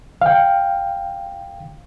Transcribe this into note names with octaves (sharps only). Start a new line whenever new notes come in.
F5 G5